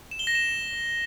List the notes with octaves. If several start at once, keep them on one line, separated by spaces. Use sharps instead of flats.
E7
G7
A#6
E7